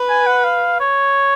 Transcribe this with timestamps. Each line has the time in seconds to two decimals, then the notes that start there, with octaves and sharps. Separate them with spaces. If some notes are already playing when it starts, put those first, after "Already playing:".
Already playing: B4
0.09 G#5
0.26 F#5
0.44 F5
0.80 C#5